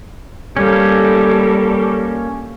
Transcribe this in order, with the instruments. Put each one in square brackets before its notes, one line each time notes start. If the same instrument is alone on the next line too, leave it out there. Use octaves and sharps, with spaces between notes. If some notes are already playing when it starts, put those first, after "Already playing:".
[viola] G3 A4 [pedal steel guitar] A#3 C#4